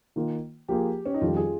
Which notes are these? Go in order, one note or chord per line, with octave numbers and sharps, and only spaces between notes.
D#3 A#3 F4
F3 A#3 F4 G4 G#4
C#4
D#4
F2 D#3 G3 F4
G#4